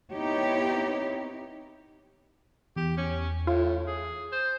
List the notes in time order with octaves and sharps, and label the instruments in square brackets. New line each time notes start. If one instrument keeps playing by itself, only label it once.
[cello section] B3 C4 D#4 E4 G4 C#5
[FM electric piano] E2 [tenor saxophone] G4
[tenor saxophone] C#4
[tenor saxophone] A2 [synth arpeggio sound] F4
[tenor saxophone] G#4
C5